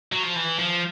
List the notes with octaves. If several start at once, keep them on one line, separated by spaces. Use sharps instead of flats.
F#3
F3
E3
F3